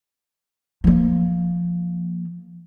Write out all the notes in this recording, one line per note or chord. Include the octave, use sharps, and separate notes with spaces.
F3 A#3